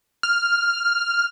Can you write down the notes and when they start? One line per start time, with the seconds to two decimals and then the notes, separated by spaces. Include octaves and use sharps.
0.23 F6